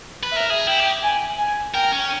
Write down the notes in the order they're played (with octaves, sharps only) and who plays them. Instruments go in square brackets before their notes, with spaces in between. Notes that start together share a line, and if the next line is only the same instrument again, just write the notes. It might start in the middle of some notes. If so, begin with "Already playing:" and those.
[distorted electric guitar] B4
[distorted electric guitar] A#4 [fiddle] E5
[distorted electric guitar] G#4
[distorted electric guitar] E4 [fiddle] G5
[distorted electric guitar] G4
[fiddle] G#5
G#5
[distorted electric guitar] A#4 [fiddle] G5
[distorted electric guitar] C#4